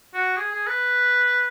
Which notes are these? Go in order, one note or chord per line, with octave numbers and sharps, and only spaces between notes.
F#4
G#4
G#4
B4